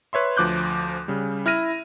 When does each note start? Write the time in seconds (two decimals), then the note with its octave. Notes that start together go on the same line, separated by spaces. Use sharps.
0.13 B4 C#5 E5 C6
0.37 D2 F3 D6 F#6 G6
1.08 C#3 G3
1.46 E4 F6 A#6 D#7